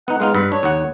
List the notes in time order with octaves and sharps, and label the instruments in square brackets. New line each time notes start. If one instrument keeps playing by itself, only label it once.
[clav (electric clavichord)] B3 D#4 [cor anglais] F#5
[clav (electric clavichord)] G#3 B3 D#4 [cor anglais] F4
[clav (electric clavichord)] G2 [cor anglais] B4
[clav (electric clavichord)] D4 [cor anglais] C#5
[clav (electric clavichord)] D#2 F#5